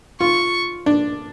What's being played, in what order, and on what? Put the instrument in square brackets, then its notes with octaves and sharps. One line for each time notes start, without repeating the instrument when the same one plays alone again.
[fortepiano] F4 [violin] C#6
[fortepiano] D4